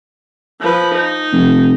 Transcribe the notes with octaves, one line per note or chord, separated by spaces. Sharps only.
F3 B4
D#4
F1